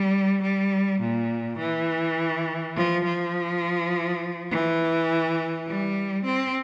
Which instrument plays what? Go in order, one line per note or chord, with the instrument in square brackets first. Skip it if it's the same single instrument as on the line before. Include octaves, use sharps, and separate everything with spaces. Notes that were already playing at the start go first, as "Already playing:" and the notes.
Already playing: [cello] G3
G3
A#2
E3
F3
F3
E3
G3
C4